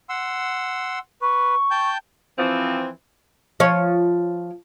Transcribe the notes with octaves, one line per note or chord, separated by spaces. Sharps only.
F#5 C6 E6
B4 C#6
G5 A5 G6
E3 F3 C4
F3 C#5